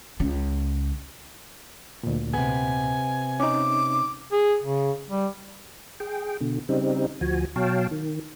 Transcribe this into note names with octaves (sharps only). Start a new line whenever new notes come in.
C#2 C#3
D2 A#2
C3 B3 G#5
C#4 D#4 D6
G#4
C#3
G3
G#4 G5
B2 D3
C#3 G3 C4 D#4
D2 F3 F#4 G#5
B2 F#3 C#5 F5 G5 A5
D#3